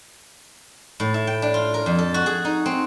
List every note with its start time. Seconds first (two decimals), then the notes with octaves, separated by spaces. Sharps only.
1.00 A2
1.14 E4
1.27 G5
1.42 D4
1.54 F4
1.74 A#4
1.86 F2
1.98 A4
2.14 F#4
2.26 G#4
2.45 D#4
2.66 C4